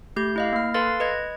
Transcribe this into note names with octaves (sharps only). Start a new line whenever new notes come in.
A3 G4 G6
E4 D#5 F5
A#3 F6
A4 B4 F5 C6 A6
B4 D#5 G#6